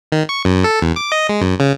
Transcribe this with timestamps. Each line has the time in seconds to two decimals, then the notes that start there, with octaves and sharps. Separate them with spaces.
0.12 D#3
0.29 C#6
0.45 F#2
0.64 A4
0.82 E2
0.96 D6
1.12 D#5
1.29 G#3
1.41 F#2
1.60 C#3